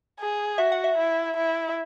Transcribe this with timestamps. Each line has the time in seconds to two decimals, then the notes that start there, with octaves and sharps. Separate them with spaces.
0.20 G#4
0.58 F#4 E5
0.72 F#5
0.84 E5
0.98 E4
1.37 E4